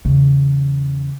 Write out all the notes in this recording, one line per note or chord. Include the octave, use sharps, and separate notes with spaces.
E2 C#3